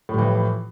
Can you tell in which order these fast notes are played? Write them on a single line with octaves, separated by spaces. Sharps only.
A2 G3 E3 F3